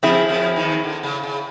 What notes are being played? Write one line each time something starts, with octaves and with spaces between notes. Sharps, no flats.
F2 F3 C4 E4 G#4
F2 F3
D#2 D#3
D3
C#3
C#3